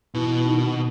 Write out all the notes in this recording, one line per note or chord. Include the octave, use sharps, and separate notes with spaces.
B2 E3
D#3